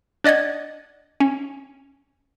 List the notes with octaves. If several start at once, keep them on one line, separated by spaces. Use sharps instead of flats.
D4 D5 D#5 F#5 G#6
C#4